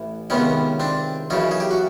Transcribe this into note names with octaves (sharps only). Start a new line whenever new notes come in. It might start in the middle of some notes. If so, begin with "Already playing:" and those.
Already playing: A1 E3
C#2 C3 D#3 B3 C#4
C4 D4
F#2 C#3 E3 C#4 D#4
G#4
G4
F#4